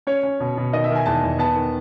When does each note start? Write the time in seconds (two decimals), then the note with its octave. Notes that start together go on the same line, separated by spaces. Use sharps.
0.07 C#4 C#5
0.23 C#4
0.40 B2
0.57 B2
0.73 D#3 D#5
0.84 E5
0.90 D#3
0.95 G#5
1.06 E2 A5
1.23 E2
1.39 B3 A5
1.56 D#3